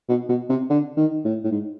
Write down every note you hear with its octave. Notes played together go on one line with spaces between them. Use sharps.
B2
B2
C3
D3
D#3
A2
A2
G#2